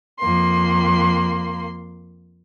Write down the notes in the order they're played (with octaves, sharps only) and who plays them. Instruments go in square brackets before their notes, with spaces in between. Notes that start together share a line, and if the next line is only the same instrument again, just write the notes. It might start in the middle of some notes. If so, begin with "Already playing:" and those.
[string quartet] F2 A#3 C6